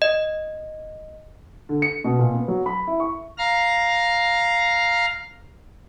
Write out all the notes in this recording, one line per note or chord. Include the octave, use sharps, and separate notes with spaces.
D#5
D3
C#7
B2
A#2
B3
F#3
B5
E4
C#6
F5 A#5 F6